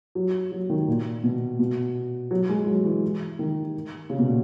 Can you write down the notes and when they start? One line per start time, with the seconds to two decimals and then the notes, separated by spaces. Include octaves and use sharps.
0.15 F#3
0.51 F#3
0.70 D#3
0.88 A#2
1.23 B2
1.59 B2
2.31 F#3
2.49 G#3
2.66 F#3
2.85 E3
3.39 D#3
4.10 C#3
4.19 B2
4.27 A#2